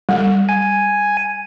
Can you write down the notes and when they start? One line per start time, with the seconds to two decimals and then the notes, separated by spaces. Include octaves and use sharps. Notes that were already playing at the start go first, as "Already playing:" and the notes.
0.09 G3
0.49 G#5